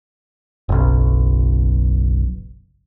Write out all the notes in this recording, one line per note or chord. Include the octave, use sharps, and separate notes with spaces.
F#1 B1